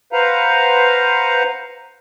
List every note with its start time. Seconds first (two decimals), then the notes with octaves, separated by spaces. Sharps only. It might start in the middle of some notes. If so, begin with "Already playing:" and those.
0.13 B4 C5 F5 F#5 A#5